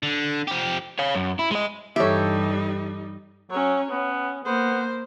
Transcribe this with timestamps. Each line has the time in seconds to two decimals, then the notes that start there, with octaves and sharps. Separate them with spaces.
0.03 D3
0.48 F3 G4
0.99 C#5 F5
1.15 F#2
1.39 E4
1.51 G#3 D#5
1.96 G2 E3 G3 D#4 G4 A4 C#5 E5
3.50 F#3 C#4 C#5
3.91 B3 C#4
4.45 A#3 B3 C5